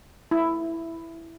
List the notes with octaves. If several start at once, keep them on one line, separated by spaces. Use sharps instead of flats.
E4